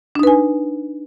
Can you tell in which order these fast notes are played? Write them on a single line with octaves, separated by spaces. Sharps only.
D4 D#4 B4 G#5